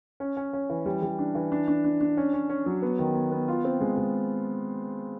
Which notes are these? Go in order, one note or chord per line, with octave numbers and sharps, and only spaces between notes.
C#4
C#4
C#4
E3
G3
G3
D4
E3
D4
D4
D4
D4
C#4
C#4
C#4
F#3
B3
D#3
B3
B3
F4
C4
G#3
G#3